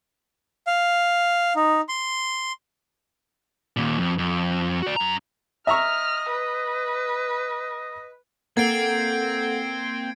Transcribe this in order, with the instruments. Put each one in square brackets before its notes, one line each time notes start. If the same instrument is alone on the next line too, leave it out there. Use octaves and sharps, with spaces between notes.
[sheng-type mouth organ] F5
D#4
C6
[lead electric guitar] D#2 A#2
F2
F2
F#4 D5
F#2 A#5
[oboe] D#5 [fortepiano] E5 A#5 C#6 [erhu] F6
[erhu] B4
[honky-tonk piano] A#3 [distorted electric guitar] C4 [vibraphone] A4 F#5 [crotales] G#6 C7 D7